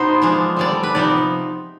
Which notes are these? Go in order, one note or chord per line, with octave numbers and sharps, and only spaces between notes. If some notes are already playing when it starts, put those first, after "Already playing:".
Already playing: B2 B3 D#4 C5
F3 G#3 D4
D3 G3 D4 D5
B4
C3 F3 B3 D#4 D5